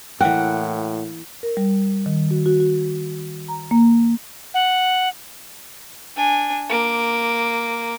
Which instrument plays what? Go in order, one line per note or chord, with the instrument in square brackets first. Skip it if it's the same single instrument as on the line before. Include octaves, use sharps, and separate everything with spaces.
[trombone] A2 [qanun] E3 A#3 [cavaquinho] F#5 [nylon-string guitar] G5
[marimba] A#4
G3
D#3
F#4
F#4
F#4
A#5
A#3
[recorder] F#5
[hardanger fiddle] D4 G#5
A#3 D6